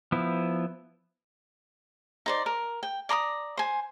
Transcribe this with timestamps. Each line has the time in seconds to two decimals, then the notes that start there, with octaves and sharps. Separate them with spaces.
0.12 F3 B3 E4
2.26 D#4 C5 D5
2.46 A#4
2.83 G5
3.09 D5 A#5 C6 D#6
3.57 C5 G#5